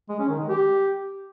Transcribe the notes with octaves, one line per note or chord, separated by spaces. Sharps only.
G#3
C#4
D#3
G#3
G4